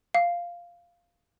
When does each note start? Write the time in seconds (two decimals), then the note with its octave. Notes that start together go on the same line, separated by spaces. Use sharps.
0.14 F5